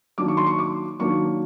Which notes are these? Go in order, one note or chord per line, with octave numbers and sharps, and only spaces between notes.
D#3 F#3 A#3 D4 D6
C#6
C6
C#6
D6
D#3 F#3 A#3 D4 C#6